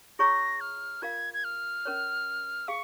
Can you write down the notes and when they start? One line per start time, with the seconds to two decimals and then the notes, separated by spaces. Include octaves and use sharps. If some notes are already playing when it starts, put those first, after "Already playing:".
0.19 F4 G#4 C#5 A#5 C#6 A#6
0.61 F6
1.02 F4 A#4 F5 G#6
1.34 G#6
1.44 F6
1.85 C#4 A#4 C#5
2.68 G#4 F5 C#6